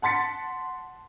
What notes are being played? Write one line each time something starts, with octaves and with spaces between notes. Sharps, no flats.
F#5 A5 C6 A6 B6 C#7